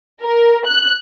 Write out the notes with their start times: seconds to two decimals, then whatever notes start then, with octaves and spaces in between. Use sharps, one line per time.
0.22 A#4
0.67 F#6